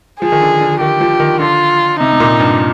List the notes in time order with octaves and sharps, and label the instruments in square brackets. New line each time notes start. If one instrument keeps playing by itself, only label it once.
[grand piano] F3 [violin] G#4
[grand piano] D#3
D3
D3
[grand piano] D#3 [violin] G4
[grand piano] F3
D#3
[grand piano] D3 [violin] F4
[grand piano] C3 [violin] D#4
[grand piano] C3
A#2
G2